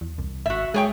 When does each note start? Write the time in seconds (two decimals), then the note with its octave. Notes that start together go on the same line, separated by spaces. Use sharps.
0.01 E2
0.18 C2
0.46 G#1 F#4 E5
0.74 G#3 G#4 C#5 G5